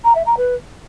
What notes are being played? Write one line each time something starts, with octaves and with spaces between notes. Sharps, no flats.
A#5
E5
A#5
B4